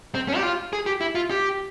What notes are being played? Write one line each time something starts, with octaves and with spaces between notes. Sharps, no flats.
C4
C#4
G4
F4
G#4
G4
E4
F4
G4